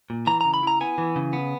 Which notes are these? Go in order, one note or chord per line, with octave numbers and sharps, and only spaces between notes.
A#2
E3 A#5
C#3 A#5
B5
E4 A#5
B3 G#5
E3
C#3
B3